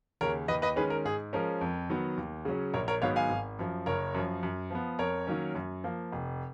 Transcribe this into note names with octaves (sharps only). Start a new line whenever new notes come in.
D#2 C#3 A#4 C#5
D#2 B4 D#5
B4 D#5
D#3 G#3 C#4 G#4 B4
A#4
G#2 G#4
F3 G#3 C#4 A#4
F2
D#3 F#3 B3
D#2
C#3 F#3 C#4
A#1 A#4 C#5
A#4 C#5
G#2 D#3 F#3 B3 C#5 F5
F5 G#5
G#1
F#2 F3
F#1 A#4 C#5
F#2 F3
F#2
F3 B3
F2 A#4 C#5
D#3 F#3 A#3 C#4
F#2
F3 A#3
F1